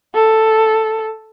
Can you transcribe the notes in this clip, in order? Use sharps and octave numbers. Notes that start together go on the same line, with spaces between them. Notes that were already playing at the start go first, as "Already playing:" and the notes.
A4